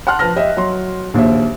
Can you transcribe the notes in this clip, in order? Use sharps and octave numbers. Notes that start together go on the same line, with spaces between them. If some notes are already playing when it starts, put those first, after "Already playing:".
F#5 A5 C6 F6 F#6
F3 B4 A5 F6 A#6
G4 D#5 E5
F#3 C6
A#1 D#2 C5 E5